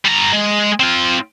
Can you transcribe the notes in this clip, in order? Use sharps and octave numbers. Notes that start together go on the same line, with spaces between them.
G3 A#5
G#3
C4 F4